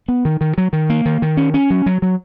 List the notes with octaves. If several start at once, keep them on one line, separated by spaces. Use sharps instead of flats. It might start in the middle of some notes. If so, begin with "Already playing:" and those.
B3
D#3
D#3
F#3
D#3
A#3
D#3
D#3
C#4
C#4
F#3
F#3
F#3